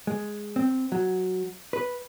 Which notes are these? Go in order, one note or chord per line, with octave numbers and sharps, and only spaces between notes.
G#3
C4
F#3
B4